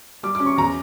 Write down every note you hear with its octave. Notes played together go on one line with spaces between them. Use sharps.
G3 D6
D6
C#4
C#6
E2 A#5